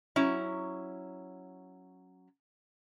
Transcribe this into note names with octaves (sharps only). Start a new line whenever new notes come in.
F#3 C#4 E4